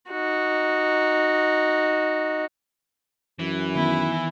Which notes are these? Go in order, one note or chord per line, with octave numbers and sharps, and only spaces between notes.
D#4 F#4
F#2 E3
D#3 B3 E4